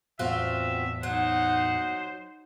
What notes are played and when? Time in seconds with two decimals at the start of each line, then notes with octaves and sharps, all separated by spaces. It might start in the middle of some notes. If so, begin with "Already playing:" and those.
0.19 E2 A2 B3 C4 F4 F#4 E5
1.03 F#3 D#4 C5 F#5